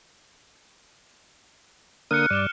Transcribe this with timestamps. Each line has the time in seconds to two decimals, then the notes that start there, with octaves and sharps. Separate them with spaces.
2.11 D3 A#3 D#6 F6 F#6 C#7
2.31 G2 D5 D#7 E7 G7